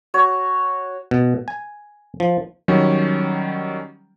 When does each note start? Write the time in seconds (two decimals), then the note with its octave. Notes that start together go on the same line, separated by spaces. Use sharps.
0.14 F#4 C#5
1.11 B2
1.48 G#5
2.20 F3
2.68 D#3 F#3 G3 C#4